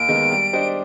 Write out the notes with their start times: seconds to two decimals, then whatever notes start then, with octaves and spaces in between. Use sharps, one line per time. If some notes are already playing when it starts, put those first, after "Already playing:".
Already playing: D#2 D7
0.08 D#3 G#3 B3
0.31 G3
0.53 D4 G4 C5 D#5